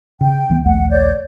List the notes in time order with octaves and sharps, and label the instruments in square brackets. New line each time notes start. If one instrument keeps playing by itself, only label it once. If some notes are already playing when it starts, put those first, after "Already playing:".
[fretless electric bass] C#3 [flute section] G5
[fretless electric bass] C#2 E3 B3
[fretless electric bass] A#1 D#2 A3 [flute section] F#5
[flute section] C#5 D5 G6